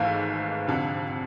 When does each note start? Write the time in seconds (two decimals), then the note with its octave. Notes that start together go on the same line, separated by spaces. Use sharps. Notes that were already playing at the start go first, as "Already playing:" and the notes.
Already playing: G#1 G#2 E3 A3 F5
0.67 F1 F2 D3